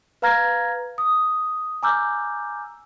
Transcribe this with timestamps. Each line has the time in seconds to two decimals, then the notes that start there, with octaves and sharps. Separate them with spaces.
0.22 B4 F5 A#5 F6 G#6 A#6
0.98 D#6
1.83 G#5 A#5 D6 E6 F6 G6